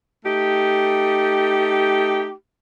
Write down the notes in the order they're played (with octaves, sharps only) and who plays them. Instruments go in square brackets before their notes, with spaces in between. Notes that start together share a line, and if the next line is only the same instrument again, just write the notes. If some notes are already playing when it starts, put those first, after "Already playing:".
[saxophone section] A3 D#4 G4